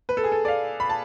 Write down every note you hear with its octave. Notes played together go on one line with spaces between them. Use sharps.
B4
A4
G#4
A4
D5
F5
B5
A5